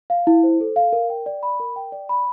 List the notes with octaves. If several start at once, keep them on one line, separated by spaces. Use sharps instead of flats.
F5
E4
C5
A4
F5
A#4
G5
D5
B5
A#4
G5
D5
B5